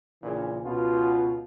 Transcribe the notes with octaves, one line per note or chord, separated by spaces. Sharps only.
A#1 A#2 C#3 E3 D4 G#4
C#2 B2 F4